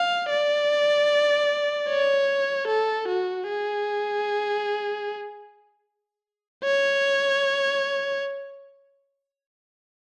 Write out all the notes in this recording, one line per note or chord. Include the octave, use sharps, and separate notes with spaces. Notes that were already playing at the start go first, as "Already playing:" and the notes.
Already playing: F5
D5
C#5
A4
F#4
G#4
C#5